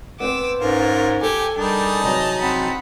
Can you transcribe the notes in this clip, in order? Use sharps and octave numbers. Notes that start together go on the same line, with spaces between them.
B3 C4 C5 D6 E6
G#2 C#4 F4 A#4
G4 A4 G5 G#5
G3 D4 D#4 G#4 A#4 A5
C3 E3 F#3 D#5 A#5
C4 F#5 B5